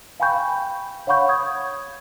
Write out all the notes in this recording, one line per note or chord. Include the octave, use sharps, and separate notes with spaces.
F5 G5 G#5 B5 C#6 G6
C#5 F5 F#5 B5 C#6 G6
C#6 D#6 G6 G#6